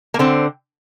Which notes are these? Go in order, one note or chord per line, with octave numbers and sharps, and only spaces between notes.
A#3
D3 C4